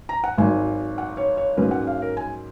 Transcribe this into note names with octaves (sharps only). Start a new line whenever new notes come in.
A#5
F#5
G#1 G#2 F#3 G#5
F#5
C#5
C#5
G#2 F#3 A#3 C#4 B4
F#5
F5
A#4
G#5